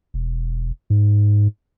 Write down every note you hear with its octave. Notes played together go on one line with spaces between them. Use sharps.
E1
G#2